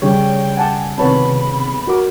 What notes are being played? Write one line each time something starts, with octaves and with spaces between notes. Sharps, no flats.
C#3 G3 C#5 G5
F#5 G#5 A5 D6
C3 D#3 B3 B4 C#5 A5 B5
F#4 A#4 D6